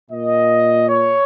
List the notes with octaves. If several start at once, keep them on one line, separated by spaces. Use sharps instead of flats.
A#2 D#5
C#5